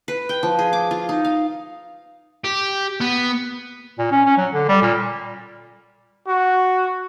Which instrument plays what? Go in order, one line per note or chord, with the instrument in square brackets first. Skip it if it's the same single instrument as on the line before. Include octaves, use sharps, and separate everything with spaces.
[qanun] B4
G5
F3
G#4
D6
F4
D#4
F5
[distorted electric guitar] G4
B3
[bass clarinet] A#2
C#4
C#4
F#3
D3
G3
A#2
[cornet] F#4